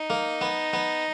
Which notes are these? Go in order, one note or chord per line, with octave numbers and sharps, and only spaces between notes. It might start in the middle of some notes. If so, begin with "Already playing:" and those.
Already playing: D#4
A#3
B3
B3